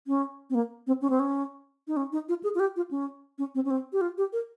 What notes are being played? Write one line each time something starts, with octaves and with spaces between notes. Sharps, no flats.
C#4
C4
A#3
C4
C#4
C4
C#4
D#4
C#4
D#4
F4
G#4
F4
G4
F4
C#4
C#4
C4
C#4
C4
G4
F4
G4
A#4